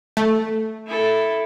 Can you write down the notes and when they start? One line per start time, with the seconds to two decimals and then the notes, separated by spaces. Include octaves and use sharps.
0.17 A3
0.87 E4 A4